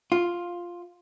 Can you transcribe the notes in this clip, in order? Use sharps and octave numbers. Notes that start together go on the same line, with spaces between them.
F4